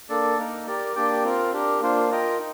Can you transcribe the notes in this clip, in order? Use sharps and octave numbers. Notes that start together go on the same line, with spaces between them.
A#3 D4 A4 D5
A#3 D#4 A#4
G4 A#4 D5
A#3 D4 G4 D5 G5
C4 F4 A#4
D4 G4 A#4
A#3 D4 F4 C5
F4 A#4 D#5 G5
D#4